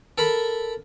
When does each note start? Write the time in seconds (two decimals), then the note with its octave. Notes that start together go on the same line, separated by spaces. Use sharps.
0.18 A4 A#4 B5